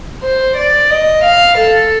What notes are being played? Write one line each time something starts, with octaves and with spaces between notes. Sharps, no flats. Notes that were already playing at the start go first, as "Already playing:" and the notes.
C5
D5
D#5
F5
A4